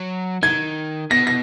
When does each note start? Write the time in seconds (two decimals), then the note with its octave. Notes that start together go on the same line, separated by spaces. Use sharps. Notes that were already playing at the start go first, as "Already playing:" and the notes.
Already playing: F#3
0.43 D#3 G#6
1.11 B2 A#6
1.27 A#6